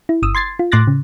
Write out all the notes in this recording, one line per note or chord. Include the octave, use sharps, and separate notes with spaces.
E4
G1 D#6 E6
C6 G#6 A6 C7
F4
A2 C6 D6 F#6 A6 A#6
C#3